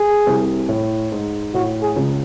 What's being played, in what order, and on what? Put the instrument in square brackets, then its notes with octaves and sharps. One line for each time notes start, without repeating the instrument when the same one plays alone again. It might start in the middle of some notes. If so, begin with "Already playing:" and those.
Already playing: [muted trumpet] G#4
[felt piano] C2 C3
A2
G#2
[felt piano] A2 [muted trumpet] F#4
[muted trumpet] G#4
[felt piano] C#2 C#3